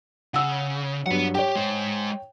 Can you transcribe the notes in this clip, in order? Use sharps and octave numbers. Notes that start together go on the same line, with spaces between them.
C#3 F#5 E6
G2 F#3 B4 F#5
G4 C#5 G5
G#3 C5